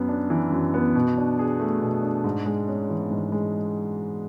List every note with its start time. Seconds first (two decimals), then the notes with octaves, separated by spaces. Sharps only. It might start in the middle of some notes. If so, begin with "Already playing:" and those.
Already playing: F#2 B3
0.09 D4
0.30 E3
0.52 F#2
0.74 B3
0.95 B2
1.17 D4
1.39 G#4
1.60 A3
1.81 B2
2.03 D4
2.24 G#2
2.46 G#3
2.68 C#4
2.90 E3
3.10 G#2
3.32 G#3